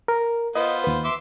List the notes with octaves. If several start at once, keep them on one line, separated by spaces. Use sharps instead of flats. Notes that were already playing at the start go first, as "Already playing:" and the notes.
A#4
B3 F4 C5 D#5
D#2 B4
E5 C6 D6